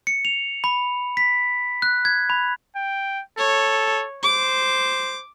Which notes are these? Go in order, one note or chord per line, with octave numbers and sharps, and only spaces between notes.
C#7
F7
B5
B6
F#6
G#6
B5
G5
A4 C#5
C5 D6